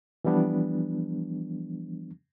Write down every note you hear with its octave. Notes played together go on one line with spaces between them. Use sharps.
E3 F3 G3 B3 D4